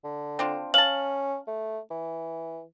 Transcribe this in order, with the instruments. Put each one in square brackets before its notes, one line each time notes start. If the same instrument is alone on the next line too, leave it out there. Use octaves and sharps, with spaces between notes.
[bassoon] D3
[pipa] C4 D4 F4
[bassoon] C#4 [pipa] F5 A5 [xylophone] F#7
[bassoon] A3
E3